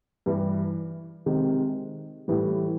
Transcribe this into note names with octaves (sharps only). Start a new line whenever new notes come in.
G2 E3 G3
C3 D#3 G#3
A2 E3 G3